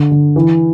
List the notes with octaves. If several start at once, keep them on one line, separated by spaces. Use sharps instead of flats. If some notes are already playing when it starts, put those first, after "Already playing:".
Already playing: D3
D3
E3